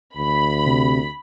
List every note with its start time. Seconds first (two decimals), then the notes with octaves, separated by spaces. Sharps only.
0.16 D2 B5
0.67 C3